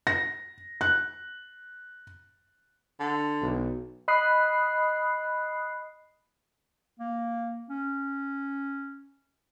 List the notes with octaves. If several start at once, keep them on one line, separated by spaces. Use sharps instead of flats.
A#6
F#6
D3
B1
D#5 B5 D#6 F#6 C7
A#3
C#4